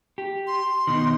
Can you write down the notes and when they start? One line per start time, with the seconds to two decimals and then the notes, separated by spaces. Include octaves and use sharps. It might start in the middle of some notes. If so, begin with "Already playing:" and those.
0.18 G4
0.47 C6
0.87 B2 D#3